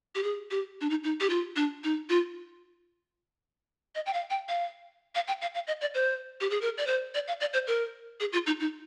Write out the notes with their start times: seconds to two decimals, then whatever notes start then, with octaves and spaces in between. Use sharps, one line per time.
0.15 G4
0.23 G#4
0.51 G4
0.81 D4
0.90 D#4
1.04 D#4
1.20 G4
1.30 F4
1.56 D4
1.84 D#4
2.09 F4
3.95 D#5
4.06 G5
4.13 F5
4.30 G5
4.49 F5
5.15 F5
5.28 G5
5.42 F5
5.55 F5
5.67 D#5
5.81 D5
5.94 C5
6.41 G4
6.50 G#4
6.61 A#4
6.78 D5
6.87 C5
7.14 D5
7.28 F5
7.40 D5
7.53 C5
7.67 A#4
8.20 G#4
8.33 F4
8.47 D#4
8.60 D#4